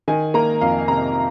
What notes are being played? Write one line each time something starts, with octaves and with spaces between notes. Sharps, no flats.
D#3 G#5
A#3 A#5
F2 F5
C3 A#5